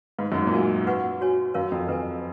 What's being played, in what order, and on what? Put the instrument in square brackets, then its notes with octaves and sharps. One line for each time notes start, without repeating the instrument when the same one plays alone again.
[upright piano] G#2 [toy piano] B4 F5 B5
[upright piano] F#2
G#2
A#2
[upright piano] G#2 [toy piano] D#4 F#4 A#4 F5 G#5
[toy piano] B4 F#5 C#6
F#4 C#5 G#5
[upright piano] F#2 [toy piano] A#4 C#5 F5
[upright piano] F2
[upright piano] F2 [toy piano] B4 D#5 G#5